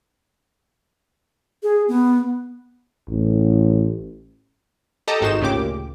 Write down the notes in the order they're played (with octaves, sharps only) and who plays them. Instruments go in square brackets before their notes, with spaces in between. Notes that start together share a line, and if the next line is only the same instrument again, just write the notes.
[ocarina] G#4
B3
[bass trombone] A1
[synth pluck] G4 A4 D#5 A5 A#5 D#6
G#1 G#2 D#4 F#4 C5 E7
D2 A#2 C#3 G4 D6